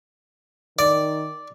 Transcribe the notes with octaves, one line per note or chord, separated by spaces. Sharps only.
D#3 D5